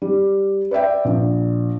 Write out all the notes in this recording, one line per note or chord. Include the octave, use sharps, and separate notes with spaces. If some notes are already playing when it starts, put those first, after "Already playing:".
G3
B4 D5 E5 G5
A#1